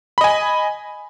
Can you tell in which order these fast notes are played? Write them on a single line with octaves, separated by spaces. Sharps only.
B5 D#5 G#5